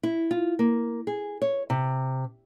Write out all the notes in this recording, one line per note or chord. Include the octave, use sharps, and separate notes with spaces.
E4
F4
A#3
G#4
C#5
C3